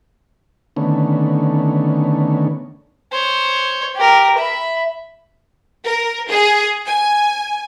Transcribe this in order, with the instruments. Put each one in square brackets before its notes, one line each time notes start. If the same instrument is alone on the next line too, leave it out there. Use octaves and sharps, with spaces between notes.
[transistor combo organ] D3 D#3 A3 B3 C#4
[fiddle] C5 C#5
G4 A#4
E5 B5
[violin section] A#4
G#4
G#5